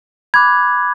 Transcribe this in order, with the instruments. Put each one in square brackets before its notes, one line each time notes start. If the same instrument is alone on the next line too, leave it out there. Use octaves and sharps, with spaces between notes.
[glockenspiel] B5 D6 F#6 G#6